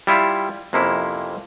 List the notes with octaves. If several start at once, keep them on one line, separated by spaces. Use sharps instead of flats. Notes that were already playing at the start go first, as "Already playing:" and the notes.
G3 E4 F4
F2 C3 A#3 C#4 E4